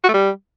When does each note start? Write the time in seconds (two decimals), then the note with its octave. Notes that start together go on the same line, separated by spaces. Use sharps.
0.04 F#4
0.09 A3
0.14 G3